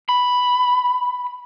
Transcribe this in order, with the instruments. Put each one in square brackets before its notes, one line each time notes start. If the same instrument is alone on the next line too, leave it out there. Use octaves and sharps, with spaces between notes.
[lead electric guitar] B5